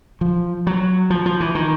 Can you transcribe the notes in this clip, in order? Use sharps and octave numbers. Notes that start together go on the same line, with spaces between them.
F3
F#3
F3
F3
E3
D#3